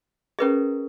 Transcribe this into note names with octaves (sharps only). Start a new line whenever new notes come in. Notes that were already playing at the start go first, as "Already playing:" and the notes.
C#4 G#4 A#4 B4 D#5